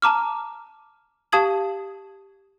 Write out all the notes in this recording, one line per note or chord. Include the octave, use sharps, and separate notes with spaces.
A5 A#5 D6 F6
G4 F5 A5 D#6 G#6 F#7